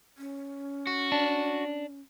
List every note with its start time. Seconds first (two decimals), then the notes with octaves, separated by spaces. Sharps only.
0.18 C#4
0.87 F#4
1.12 D4